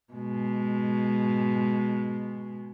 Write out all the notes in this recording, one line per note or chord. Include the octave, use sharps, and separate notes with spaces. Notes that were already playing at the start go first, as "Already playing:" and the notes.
B2 G#3